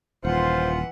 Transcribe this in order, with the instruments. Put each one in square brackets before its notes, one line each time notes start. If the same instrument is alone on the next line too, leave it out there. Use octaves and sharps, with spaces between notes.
[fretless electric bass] D#1 [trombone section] A#2 F4 [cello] E3 F#5 [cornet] C5